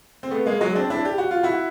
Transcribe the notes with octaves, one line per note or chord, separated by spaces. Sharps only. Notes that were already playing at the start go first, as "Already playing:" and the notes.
C4
A3 B3
G#3 A#3
F#3 G#3
C4 D4
D4 E4
G4
F#4
F4
E4 F#4